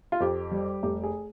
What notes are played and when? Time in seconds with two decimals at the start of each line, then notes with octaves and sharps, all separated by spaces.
0.12 F4
0.20 F2 G4
0.51 G3
0.83 F1 G4
1.03 G#4